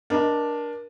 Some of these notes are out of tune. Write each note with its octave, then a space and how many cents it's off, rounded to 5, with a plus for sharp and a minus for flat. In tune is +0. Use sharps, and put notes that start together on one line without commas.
D4 +0 A#4 +25 D#5 +0